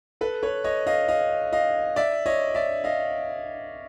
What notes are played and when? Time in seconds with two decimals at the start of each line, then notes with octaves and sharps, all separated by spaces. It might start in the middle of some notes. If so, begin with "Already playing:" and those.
0.21 A4 B4
0.43 B4 C#5
0.64 C#5 D#5
0.87 D#5 F5
1.08 D#5 F5
1.53 D#5 F5
1.96 D5 E5
2.26 C#5 D#5
2.55 D5 E5
2.84 D#5 F5